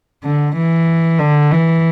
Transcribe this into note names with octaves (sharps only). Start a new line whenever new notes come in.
D3
E3
D3
E3